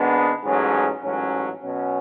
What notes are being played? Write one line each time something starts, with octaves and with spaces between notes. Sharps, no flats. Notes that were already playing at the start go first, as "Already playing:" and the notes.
Already playing: G#1 G#2 G#3 B3 D4
A1 G#2 F#3 C#4 G#4
A1 G#2 F#3 C#4
B2 F#3 C#4